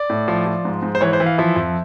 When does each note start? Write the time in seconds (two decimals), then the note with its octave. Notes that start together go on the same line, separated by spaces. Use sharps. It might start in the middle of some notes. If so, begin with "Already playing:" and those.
Already playing: D5
0.10 A2
0.28 F3
0.46 F3
0.65 G#2
0.82 G#2
0.95 C5
1.01 E3 C#5
1.13 C5
1.20 E3
1.26 F5
1.38 F3 E5
1.56 F2